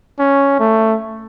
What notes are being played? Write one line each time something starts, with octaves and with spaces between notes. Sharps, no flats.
C#4
A3